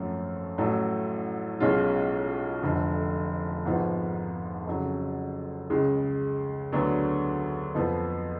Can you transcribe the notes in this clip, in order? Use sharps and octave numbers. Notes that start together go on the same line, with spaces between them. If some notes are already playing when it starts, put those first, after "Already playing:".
Already playing: G#1 F#2 F3 A3 C#4
A1 A2 F#3 A3
B1 B2 G#3 C#4 F4
F1 F2 D3 F3
G#1 G#2 F3 B3
F2 C#3 F#3
C#2 C#3 G#3
D2 D3 F#3 B3 D4
F2 F3 B3